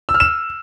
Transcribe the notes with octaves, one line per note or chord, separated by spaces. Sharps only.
E6
F6
E7